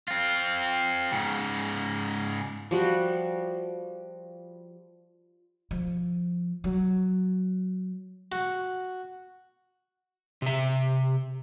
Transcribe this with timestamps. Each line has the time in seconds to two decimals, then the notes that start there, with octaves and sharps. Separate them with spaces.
0.08 C4 F4
1.12 G#2 C#3
2.71 F3 G3 F#4
5.71 F3
6.64 F#3
8.32 F#4
10.42 C3 E5